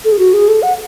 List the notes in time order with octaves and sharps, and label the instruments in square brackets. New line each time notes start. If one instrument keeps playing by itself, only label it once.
[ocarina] A4
G#4
F#4
G#4
A4
F#5